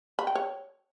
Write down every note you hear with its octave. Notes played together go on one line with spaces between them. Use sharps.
B5
G5
C#5